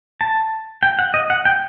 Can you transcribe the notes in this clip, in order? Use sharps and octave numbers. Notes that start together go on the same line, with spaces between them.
A5
G5
F#5
D#5
F#5
G5